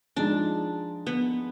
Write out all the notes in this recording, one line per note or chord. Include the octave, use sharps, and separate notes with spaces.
F3 G#3 D4 D#4
B3